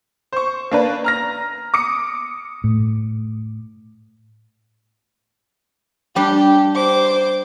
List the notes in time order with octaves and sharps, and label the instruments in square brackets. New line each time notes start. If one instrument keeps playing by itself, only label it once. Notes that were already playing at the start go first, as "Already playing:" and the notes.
[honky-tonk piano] C5 C#6
A#3 D4 B4
A#5 F6 A#6
D6 D#6 C#7
[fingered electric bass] A2
[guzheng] G3 D4 [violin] G4
[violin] C5 D6